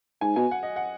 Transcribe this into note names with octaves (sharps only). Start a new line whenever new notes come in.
G#2 G#5
B2 G#5
F#5
D#5
F#5